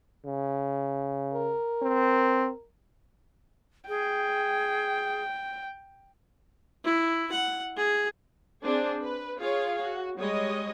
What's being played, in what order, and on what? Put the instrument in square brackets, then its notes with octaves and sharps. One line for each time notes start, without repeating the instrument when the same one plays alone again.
[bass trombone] C#3
[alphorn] A#4
[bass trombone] C4
[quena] G#4 [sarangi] G5
[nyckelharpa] E4
F#5
G#4
[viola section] C4 D4 G#4 C5
B4
F4 G#4 C#5 F5
F#4
G3 G#3 C#5 D#5